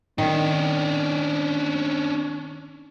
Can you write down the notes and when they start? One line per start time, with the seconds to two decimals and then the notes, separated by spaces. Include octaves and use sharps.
0.18 D#3 C#4 D4